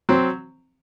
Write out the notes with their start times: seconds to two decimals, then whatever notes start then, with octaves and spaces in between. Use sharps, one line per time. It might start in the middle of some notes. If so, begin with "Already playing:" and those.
0.09 F#3 C4